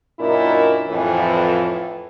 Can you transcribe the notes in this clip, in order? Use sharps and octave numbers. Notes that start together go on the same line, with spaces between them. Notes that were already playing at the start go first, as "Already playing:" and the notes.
F#2 A#2 D4 E4 A#4 D#5
F2 A2 E3